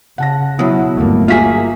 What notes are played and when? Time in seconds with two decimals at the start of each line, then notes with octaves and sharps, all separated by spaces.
0.18 C#3 F#5 A5 A#6
0.59 B2 F#3 E4
0.97 G1 D#2 A3 A#3
1.28 A#3 F4 F#4 G#4 E5 B6 C7